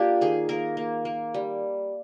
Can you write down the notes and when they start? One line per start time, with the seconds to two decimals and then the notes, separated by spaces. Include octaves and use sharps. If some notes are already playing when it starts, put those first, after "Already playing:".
Already playing: A#3 D4 F4 G4
0.21 D#3 G#4
0.49 A#3 A#4
0.77 A#3
1.05 A#3
1.34 G3